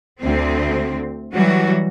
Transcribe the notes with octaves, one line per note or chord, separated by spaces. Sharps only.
D2 C4
E3 F#3 G3 F#4